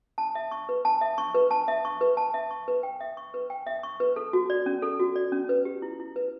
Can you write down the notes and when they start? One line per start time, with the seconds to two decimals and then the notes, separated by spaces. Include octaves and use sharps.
0.18 A5
0.35 E5
0.51 C#6
0.69 B4
0.85 A5
1.01 E5
1.18 C#6
1.35 B4
1.51 A5
1.68 E5
1.85 C#6
2.01 B4
2.17 A5
2.34 E5
2.51 C#6
2.68 B4
2.83 G5
3.01 E5
3.17 C#6
3.34 B4
3.50 G5
3.67 E5
3.83 C#6
4.00 B4
4.16 A4
4.33 F#4
4.50 D5
4.66 C#4
4.82 A4
4.99 F#4
5.16 D5
5.32 C#4
5.49 B4
5.65 G4
5.82 E4
6.00 E4
6.16 B4